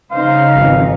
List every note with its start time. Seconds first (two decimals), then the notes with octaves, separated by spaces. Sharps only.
0.12 C#3 D#4 C5 F5
0.55 G#1 F2 E3